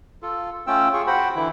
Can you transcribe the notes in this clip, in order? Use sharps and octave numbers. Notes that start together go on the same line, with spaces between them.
F4 A4
A3 C#4 F4 G5 E6
F4 G#4 C#6
F#4 C5 F#5 G5 B5
D3 E3 E4